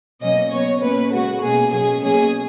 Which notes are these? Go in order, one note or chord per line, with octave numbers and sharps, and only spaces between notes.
B2 F#3 A#3 C#4 D#5
C#3 F#3 B3 C#5
A#2 A#3 C#4 B4
C#3 G#3 B3 F#4
B2 A#3 C#4 G#4
B2 F#3 C#4 G#4
B2 F#3 A#3 C#4 G#4